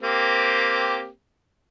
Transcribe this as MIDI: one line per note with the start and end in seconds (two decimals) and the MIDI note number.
0.03 1.08 58
0.03 1.08 60
0.03 1.08 67